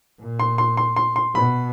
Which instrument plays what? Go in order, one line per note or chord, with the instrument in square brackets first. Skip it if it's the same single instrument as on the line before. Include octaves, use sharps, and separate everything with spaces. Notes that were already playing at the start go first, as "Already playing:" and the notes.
[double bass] A#2
[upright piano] C6
C6
C6
C6
C6
[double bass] B2 [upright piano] B5